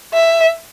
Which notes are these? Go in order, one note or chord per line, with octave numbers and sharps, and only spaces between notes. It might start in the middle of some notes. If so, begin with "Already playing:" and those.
E5